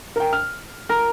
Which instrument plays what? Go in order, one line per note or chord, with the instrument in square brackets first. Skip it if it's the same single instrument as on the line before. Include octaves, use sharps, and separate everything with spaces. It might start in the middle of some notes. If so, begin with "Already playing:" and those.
[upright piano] A#4 G5
F6
[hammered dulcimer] A#4